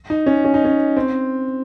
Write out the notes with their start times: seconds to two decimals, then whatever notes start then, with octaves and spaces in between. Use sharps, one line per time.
0.10 D#4
0.26 C#4
0.45 C#4
0.54 D#4
0.65 C#4
0.97 C4